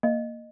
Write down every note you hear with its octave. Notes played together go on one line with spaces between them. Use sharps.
A#3 D#5